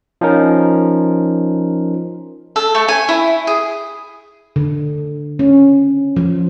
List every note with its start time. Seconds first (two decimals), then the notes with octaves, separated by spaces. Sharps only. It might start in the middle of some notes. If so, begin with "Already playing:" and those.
0.21 F3 C#4 D#4 A#4
2.56 A4
2.75 A3
2.88 G#5
3.09 E4
3.47 G#4
4.56 D3
5.39 C#4
6.16 F3